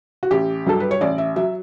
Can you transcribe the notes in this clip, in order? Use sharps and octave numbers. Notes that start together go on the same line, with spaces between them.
F#4
A1 G4
G2 F#3 A4
B4
C#5
A1 D5
E5
F#3 E5